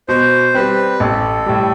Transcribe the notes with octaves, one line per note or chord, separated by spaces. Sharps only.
B2 C5
G3 C4 B4
A1 A4
A2 G3